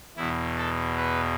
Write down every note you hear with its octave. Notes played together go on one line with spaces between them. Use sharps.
E2 B2 E4
A4
B4